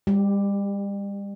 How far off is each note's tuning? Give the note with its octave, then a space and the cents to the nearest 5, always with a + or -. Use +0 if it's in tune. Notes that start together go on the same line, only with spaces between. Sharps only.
G3 +35 G4 +0